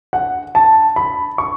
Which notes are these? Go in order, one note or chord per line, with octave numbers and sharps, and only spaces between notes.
F#5
A5
B5
C#6